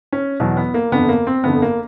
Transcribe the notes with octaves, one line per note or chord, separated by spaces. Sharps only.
C#4
E2 B2 F#3
B3
A#3
G1 F2 D3 B3
A#3
C4
G1 F2 D3 B3
A#3